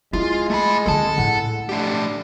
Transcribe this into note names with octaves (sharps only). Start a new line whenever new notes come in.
G#3 E4 F4
A3 B5
F2 D3 A4 A5
A2 F#5
A3 D4 G4